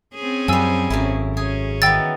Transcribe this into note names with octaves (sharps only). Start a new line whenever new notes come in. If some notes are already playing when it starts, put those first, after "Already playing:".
C4 C#4 G#4
F#2 F3 G3 G#5 E6
G#1 F#2 A3 E4
C#4 G#4
D#3 E3 B3 G5 E6 A6